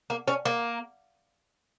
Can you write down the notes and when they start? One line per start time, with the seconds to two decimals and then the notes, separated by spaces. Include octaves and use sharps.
0.10 A#3
0.28 C#4
0.45 A#3